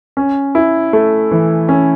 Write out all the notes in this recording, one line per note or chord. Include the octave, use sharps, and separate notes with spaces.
C#4
E4
A3
E3
C#4